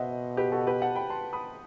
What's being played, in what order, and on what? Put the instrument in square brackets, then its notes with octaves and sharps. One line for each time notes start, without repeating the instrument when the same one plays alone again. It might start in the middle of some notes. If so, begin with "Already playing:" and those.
Already playing: [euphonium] B2 [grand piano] C5 D#5 E5 F#5
[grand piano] G4 B4
F#4 A4
G4 B4
F#5 A5
G5 B5
A5 C6
B5 D#6